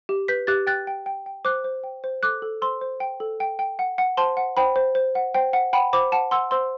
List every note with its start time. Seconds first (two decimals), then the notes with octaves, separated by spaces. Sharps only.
0.09 G4
0.28 B4 G6 B6
0.47 G4 F#6 A6
0.67 G5 F#6 A6
0.87 G5
1.06 G5
1.26 G5
1.45 C5 D6 F#6
1.64 C5
1.84 G5
2.04 C5
2.23 A4 D6 F#6
2.42 A4
2.62 C5 C6 E6
2.81 C5
3.00 G5
3.20 A4
3.40 G5
3.59 G5
3.79 F#5
3.98 F#5
4.17 C5 A5 C6
4.37 F#5
4.57 C5 G5 B5
4.76 C5
4.95 C5
5.15 F#5
5.34 C5 G5
5.53 F#5
5.73 F#5 G5 B5
5.93 C5 B5 D6
6.12 F#5 A5
6.31 F#5 C6 E6
6.51 C5 C6 E6